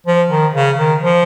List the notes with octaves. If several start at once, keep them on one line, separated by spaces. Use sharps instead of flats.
F3
D#3
C#3
D#3
F3